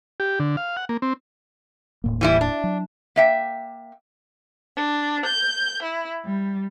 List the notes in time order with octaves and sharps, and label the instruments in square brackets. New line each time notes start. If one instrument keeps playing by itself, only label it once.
[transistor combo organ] G4
D3
F5
F#5
A#3
C4
[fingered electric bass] D#1 A2 A#3
[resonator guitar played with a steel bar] E3 G3 E4
D4
[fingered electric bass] F#3
[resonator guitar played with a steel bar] A#3 E5 G5
[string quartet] D4
G6
E4
G3